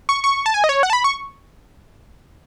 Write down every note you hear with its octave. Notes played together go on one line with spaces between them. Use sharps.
C#6
C#6
A5
G#5
D#5
C#5
F#5
A5
B5
C#6